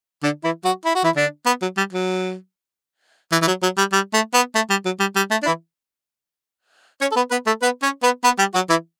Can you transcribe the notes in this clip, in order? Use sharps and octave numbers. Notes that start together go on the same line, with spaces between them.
D3 D4
E3 E4
F#3 F#4
E4
F#4
E3 E4
D3 D4
B3
F#3
G3
F#3
E3
E3
F#3
F#3
G3
G3
A3
B3
A3
G3
F#3
G3
G3
A3
D4
E3 E4
C#4 C#5
A4
B3 B4
B3 B4
A3 A4
B3 B4
C#4 C#5
B3 B4
B3 B4
G3 G4
F#3 F#4
E3 E4